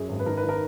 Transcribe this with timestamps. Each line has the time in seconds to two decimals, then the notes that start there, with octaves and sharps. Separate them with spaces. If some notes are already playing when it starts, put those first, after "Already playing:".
Already playing: F#2 G#4
0.09 G#1
0.19 B4
0.26 D#3 A#4
0.37 B4
0.44 D#3
0.49 A#4